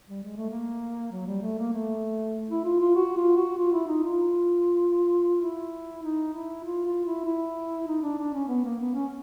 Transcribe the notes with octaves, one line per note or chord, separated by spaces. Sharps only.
G3
G#3
A3
A#3
F#3
G3
A3
A#3
A3
E4
F4
F4
F#4
F4
F#4
F4
E4
D#4
F4
E4
D#4
E4
F4
F4
E4
E4
D#4
D4
D4
C#4
B3
A#3
B3
C#4